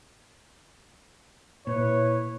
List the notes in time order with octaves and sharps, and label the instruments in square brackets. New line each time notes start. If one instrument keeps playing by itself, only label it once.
[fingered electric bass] A#2 [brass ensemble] E4 B4 C#5